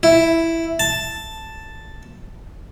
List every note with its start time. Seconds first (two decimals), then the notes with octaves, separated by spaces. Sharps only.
0.03 E4
0.80 A5